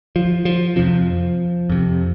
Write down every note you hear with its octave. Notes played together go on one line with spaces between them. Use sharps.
F3
F3
F2 C3 F3
F2 C3